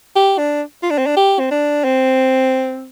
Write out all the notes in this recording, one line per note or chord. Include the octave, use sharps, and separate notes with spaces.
G4
D4
F4
D4
C4
D4
G4
C4
D4
C4